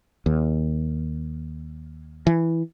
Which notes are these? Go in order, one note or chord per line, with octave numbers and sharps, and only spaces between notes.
D#2
E3